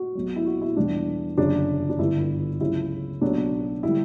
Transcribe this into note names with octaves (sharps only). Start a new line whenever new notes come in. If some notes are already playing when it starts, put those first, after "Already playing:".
Already playing: F#4
B1 B2 F#3
E4
F#4
E4
E2 B2 G3 D4
G1 F#2 C#3 D4
D4
G1 G2 D3 G3 E4
C#2 C#3 F#3 E4
B1 B2 F#3 D4
D3 G3 E4